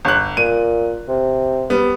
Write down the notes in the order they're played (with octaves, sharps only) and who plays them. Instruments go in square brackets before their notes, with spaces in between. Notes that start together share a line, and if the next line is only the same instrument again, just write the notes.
[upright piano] G1 F#6
[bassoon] A#2 [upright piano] D#7
[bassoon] C3
[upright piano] G3 B3